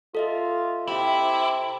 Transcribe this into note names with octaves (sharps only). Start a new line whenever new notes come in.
F4 A4 D#5 E5
C3 E4 G4